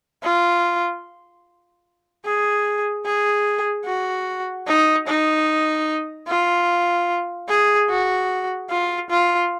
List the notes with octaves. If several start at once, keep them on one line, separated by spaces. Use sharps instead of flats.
F4
G#4
G#4
F#4
D#4
D#4
F4
G#4
F#4
F4
F4